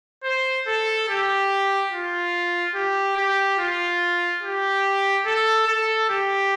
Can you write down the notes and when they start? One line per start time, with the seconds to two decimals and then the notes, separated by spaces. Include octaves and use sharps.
0.24 C5
0.67 A4
1.09 G4
1.92 F4
2.75 G4
3.17 G4
3.59 F4
4.43 G4
5.26 A4
5.67 A4
6.09 G4